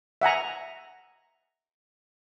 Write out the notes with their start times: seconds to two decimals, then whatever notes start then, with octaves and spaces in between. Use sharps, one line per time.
0.21 E5 F#5 G#5 A#5